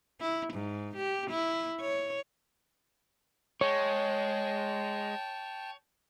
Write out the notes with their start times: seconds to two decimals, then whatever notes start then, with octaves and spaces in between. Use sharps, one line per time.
0.21 E4
0.54 G#2
0.96 G4
1.31 E4
1.80 C#5
3.61 G#3 C#5 G5 A5